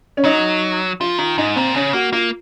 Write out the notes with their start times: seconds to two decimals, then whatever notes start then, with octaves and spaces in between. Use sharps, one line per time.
0.17 C#4
0.25 F#3 D#4
1.00 F3 F4
1.18 D#3 F4
1.38 G#2 D#4
1.56 A#2 C4
1.74 C#3 C#4
1.93 A#3 F#4
2.12 A#3 F4